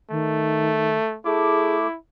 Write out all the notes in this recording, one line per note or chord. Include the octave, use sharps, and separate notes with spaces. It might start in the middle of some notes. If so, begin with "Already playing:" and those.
D#3 A3
A3 E4 G#4 D6